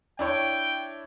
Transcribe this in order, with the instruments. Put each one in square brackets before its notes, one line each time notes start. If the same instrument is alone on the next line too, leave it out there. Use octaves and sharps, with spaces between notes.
[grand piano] D4 E4 C#5 [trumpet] G5